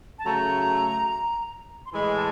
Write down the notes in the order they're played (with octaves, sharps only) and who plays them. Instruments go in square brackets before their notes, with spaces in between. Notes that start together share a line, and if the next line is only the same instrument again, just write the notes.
[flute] A5
[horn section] C#3 F#3 A3 [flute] A#5
[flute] C6
[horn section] A2 E3 G#3 [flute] B5
[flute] A5